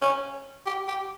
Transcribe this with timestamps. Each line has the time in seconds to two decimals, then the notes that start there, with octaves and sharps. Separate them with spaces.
0.02 C#4
0.66 G4
0.88 G4